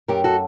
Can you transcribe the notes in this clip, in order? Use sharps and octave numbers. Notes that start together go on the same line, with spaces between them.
F#2 G4 A#4
F#4 A4